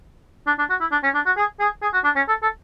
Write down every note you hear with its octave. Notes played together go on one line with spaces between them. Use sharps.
D4
D4
F#4
E4
D4
C#4
D4
F#4
G#4
G#4
G#4
F#4
D4
C#4
A4
A4